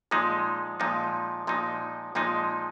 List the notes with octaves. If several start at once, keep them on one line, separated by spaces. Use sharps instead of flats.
A#2 F3 G#3 D#4
A#2 F3 G#3 D#4
A#2 F3 G#3 D#4
A#2 F3 G#3 D#4